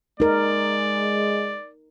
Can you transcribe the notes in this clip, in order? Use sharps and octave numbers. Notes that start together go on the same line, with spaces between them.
G#3 D#4 A#4 D5